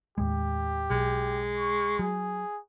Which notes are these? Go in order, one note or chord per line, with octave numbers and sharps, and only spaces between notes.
D#2 A2 G#3 G4
B1 G#3
C#6
F#3 G#4